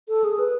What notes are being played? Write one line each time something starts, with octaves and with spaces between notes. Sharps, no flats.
A4
G#4
B4